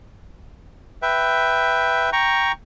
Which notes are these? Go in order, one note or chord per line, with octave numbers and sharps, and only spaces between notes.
B4 E5 G5
G5 A#5 C#6